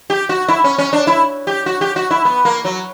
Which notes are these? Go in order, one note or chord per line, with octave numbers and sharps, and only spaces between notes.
G4
F#4
E4
C#4
C#4
D4
E4
G4
F#4
G4
F#4
E4
B3
A#3
F#3